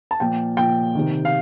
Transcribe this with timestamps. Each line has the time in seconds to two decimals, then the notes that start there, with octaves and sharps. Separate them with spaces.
0.11 A5
0.20 A#2 F3 G5
0.57 A#2 F3 G5
0.95 C3 D#3
1.25 F5